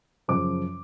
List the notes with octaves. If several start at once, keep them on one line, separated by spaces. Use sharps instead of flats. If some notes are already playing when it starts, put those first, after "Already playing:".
F#2 C#3 F3 D6